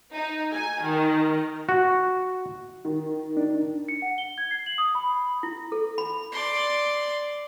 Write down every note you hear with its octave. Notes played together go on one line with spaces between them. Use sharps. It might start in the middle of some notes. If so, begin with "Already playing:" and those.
D#4
G#5
D#3
F#4
D#3
D4 D#4
C#7
F#5
G7
G#6
C7
F#7
D#6
B5
E4
A4
B5
D5 C6